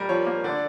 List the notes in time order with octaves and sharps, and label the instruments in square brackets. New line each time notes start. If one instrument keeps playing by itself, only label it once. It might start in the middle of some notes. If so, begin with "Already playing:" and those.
Already playing: [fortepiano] G3 [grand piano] A#4
[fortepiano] F3 [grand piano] C#5
[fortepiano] A#3
[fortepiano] D3 [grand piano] D5